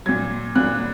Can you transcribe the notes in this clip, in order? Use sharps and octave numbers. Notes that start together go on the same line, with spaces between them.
A#2 F#3 G#6
A#2 F#3 F#6